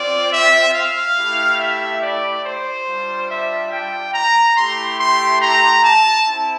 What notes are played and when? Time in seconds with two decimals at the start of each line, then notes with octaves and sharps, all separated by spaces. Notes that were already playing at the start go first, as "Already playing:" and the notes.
Already playing: C4 F4 D5
0.32 E5
0.75 F5
1.18 A3 E4 G4
1.60 E5
2.02 D5
2.45 C5
2.87 G3 D4 F4
3.29 E5
3.72 G5
4.14 A#5
4.57 A3 E4 G4 C6
5.00 C6
5.41 A#5
5.85 A5
6.27 C4 E4